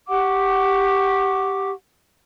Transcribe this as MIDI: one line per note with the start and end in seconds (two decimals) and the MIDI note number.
0.09 1.71 67
0.09 1.71 78
0.09 1.71 85
0.09 1.71 86